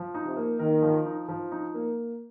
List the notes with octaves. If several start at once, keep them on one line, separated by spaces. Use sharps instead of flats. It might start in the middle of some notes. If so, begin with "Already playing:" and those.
Already playing: F3
D#4
C3
A#3
D#3 A#4
F3
D#4
F3
D#4
A#3